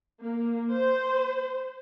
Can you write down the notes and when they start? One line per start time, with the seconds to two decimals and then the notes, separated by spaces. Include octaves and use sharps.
0.21 A#3
0.73 C5